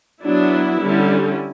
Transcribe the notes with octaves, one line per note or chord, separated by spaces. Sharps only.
F#3 B3 D4 E4
D3 G3 C#4